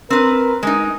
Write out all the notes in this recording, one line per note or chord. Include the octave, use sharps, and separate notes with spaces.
C4 A#4 B4
G#3 D#4